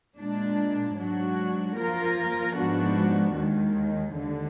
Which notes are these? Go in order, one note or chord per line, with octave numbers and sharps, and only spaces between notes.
A#2 G#3 D4
G#2 F#3 D4 F#4
F3 A#3 F4 A#4
G#2 F3 B3 D4 F#4
D#2 D#3 G#3
D#2 D3 G#3